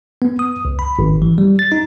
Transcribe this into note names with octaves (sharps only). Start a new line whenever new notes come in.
B3
D#6
C#2
B5
G#1
E3
G3
A6
D#4